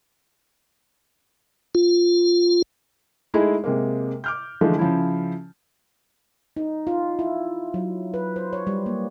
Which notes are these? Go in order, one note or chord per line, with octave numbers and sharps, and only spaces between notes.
F4
G#3 A3 D#4 E4 G#4
C3 G#3 A#3
D6 F6 G6
D3 E3 F3 G#3 A3
C#3 F3 C#4 E4
D#4
F4
E4
F#3
B4
C5
C#5
G3
A#3